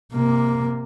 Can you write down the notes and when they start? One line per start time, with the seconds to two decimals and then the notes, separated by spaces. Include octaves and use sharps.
0.13 C3 A#3